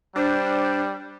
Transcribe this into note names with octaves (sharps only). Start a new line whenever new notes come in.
G3 D4 C5